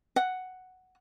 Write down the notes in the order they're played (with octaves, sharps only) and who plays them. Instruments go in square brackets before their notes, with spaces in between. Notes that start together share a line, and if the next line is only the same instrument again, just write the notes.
[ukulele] F#5